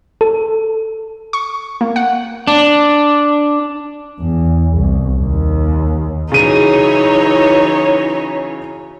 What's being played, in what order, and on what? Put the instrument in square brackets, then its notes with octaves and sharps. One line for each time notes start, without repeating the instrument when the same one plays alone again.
[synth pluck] A4
[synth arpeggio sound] C#6
A#3
F#5
[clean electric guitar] D4
[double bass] E2
C2
D#2
[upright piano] C#3 D#7 [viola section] E3 F#3 C#5 [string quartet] D#4